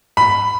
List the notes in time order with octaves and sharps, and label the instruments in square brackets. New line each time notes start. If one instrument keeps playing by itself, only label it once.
[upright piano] B5